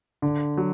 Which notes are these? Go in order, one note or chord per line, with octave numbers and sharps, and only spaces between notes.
D3
F#3